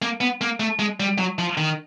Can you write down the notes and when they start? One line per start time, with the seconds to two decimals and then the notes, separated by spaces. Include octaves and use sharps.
0.02 A#3
0.21 B3
0.41 A#3
0.60 A3
0.79 G#3
1.00 G3
1.18 F#3
1.39 F3
1.58 D#3